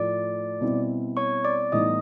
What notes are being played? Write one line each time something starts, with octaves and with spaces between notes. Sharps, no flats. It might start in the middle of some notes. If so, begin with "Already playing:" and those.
Already playing: A2 F3 A3 D5 D6
B2 G3 C4 E4
C#5 C#6
D5 D6
A2 E3 G3 B3 D#4 D#5 D#6